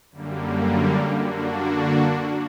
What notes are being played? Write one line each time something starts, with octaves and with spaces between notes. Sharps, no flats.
F#2 D3 G3 A#3
D3 A#3 D4 F#4